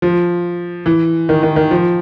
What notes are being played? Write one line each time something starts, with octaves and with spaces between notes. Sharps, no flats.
F3
E3
D#3
D#3
D#3
F3